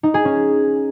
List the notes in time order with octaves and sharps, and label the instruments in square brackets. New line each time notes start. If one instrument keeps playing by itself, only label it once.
[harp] D#4
G#4
C#4